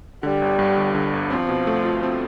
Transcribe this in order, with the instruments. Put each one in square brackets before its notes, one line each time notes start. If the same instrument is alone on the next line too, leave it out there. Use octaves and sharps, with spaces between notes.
[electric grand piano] D3 [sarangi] G3
[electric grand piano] G1
G2
G1
D3
G1
[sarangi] F3 [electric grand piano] C4
[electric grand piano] B2
A3
F4
C4